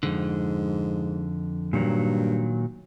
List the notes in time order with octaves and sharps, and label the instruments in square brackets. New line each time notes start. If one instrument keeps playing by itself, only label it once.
[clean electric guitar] F2 D3 [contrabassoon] G#2
[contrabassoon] G2 [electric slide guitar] A#2 D#3 F#3